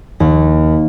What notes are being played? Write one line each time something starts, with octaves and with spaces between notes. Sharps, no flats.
D#2